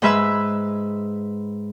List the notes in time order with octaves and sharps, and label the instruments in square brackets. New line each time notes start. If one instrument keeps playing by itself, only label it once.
[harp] G#2 G#3 B4 E5 B5 E6